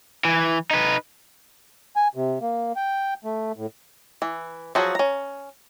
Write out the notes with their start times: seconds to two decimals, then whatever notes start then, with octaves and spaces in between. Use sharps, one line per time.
0.25 E3
0.71 D#4 B4
1.96 G#5
2.15 C3
2.41 A#3
2.76 G5
3.24 A3
3.57 A2
4.22 E3
4.75 F3 F#3 F#4 G#4
4.95 C#4 A#5